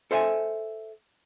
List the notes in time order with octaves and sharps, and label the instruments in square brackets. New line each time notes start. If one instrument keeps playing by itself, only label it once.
[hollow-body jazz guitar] A4 C5 E5 G5 G#5